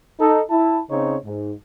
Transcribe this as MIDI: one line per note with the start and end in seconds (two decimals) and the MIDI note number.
0.20 0.42 63
0.20 0.42 69
0.50 0.78 64
0.50 0.78 81
0.91 1.16 49
0.91 1.16 60
0.91 1.16 63
0.91 1.16 73
1.25 1.53 44